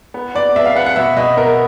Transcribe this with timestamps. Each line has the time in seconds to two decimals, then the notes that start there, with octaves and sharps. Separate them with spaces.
0.14 B3
0.35 B3 D5
0.56 B3 E5
0.66 F5
0.75 B3 F#5
0.86 F#5
0.96 B2 E5
1.16 B2 D#5
1.37 B3 A#4